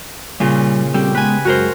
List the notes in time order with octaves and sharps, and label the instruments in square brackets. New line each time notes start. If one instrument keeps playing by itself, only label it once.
[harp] A#2 C#3 [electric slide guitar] G3
[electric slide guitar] G3 C4 A4 [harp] G4
[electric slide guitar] G#3 B3 [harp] B4 G#5
[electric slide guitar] F#2 G#3 [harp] F#4 A#4 C5